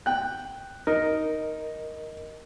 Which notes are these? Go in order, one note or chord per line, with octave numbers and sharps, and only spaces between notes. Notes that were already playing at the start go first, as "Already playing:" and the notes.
G5 F#6
D#4 A#4 D#5